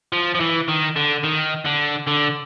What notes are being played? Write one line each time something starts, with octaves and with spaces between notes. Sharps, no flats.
F3
F3
E3
D#3
D3
D#3
D3
D3